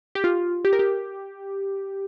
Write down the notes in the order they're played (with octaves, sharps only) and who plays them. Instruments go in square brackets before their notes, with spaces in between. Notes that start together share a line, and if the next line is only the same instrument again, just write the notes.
[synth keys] G4
F4
G4
A#4
G4